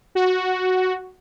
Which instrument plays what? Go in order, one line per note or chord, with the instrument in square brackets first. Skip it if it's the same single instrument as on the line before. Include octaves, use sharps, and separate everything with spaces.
[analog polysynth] F#4